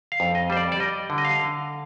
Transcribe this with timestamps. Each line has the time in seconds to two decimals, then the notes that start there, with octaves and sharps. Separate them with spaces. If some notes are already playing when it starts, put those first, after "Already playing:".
0.12 F5
0.20 F2
0.35 D#5
0.50 G3 C5
0.57 D5
0.72 D5
0.80 G3 D#5
1.10 D3
1.18 D#5
1.25 F5
1.40 D3